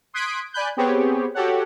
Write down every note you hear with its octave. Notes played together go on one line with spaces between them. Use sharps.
C6 D#6 F#6 G#6 B6 D7
D5 G#5 B5 F#6 G6
B3 C4 G4 G#4 B4 C#5
F#4 G4 A4 C#5 F#5